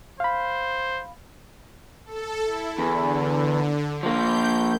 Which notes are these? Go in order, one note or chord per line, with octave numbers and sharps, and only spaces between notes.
C5 F5 B5
A4
E4
E2 D3
F3 A#3 G6